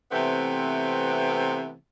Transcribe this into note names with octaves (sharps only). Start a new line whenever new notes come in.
C3 E3 A3 B3 C4